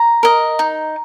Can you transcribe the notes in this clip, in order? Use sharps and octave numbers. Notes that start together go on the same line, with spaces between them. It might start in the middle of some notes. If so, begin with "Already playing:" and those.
Already playing: A#5
A#4 D#5
D#4